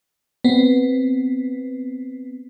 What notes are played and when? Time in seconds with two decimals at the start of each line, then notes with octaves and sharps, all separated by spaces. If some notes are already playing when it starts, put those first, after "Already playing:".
0.44 B3 C4